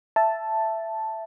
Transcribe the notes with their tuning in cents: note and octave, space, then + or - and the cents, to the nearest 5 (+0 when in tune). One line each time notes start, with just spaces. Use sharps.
E5 +10 A5 +0